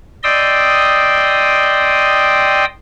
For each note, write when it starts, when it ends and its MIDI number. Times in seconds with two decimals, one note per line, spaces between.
0.23 2.65 74
0.23 2.65 75
0.23 2.65 79
0.23 2.65 84
0.23 2.65 87
0.23 2.65 88